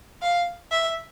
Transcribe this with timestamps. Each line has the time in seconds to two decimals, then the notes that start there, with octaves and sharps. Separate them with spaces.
0.22 F5
0.71 E5